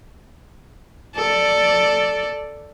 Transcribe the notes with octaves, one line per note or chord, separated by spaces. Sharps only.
A4 D5